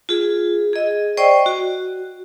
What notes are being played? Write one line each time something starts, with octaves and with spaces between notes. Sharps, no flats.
F4 G#4
G#4 D#5
C5 D5 D#5 G5 C#6
F#4